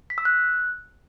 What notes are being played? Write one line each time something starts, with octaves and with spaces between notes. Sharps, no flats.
B6
E6
F#6